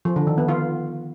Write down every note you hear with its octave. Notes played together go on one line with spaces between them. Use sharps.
F3
D3
D#3
B3
F4